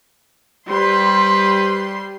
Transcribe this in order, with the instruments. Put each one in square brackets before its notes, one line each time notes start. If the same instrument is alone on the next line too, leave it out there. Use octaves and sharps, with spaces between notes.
[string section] G3 C6 [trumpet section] B4 C5